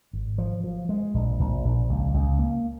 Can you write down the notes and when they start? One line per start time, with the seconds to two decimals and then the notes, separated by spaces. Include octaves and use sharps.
0.13 G#1
0.38 F3
0.64 F3
0.89 G#3
1.14 A#1
1.39 A#1
1.65 A#1
1.90 C#2
2.14 C#2
2.39 A#3